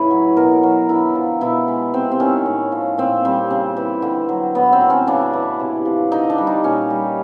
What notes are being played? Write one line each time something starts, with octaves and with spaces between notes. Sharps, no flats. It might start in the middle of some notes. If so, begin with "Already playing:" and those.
Already playing: A2 C#3 E3 B4 C#5
F#3
B2 A#4
F#3
D3 E4
F3
B2 E4
G#3
C3 C4
C4
D#3 C#4
A2
F3
A#2 C4
G3 C4
C#3
E3
D3
F#3
A2 B3
C4
F#3
C#4
C#3 D4
E3
C3
F3
D3 D#4
D4
G3
D#4
A#2 C#4
G3